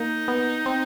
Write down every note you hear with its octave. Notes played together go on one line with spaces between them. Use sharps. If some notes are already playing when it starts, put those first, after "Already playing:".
Already playing: A#3 D#4
B3
C4